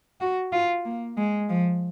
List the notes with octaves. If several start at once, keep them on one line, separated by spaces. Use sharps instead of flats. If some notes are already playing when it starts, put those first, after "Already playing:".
F#4
F4
A#3
G#3
F3